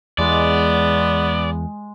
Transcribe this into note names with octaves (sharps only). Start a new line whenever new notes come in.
E2 G#3 B3 D5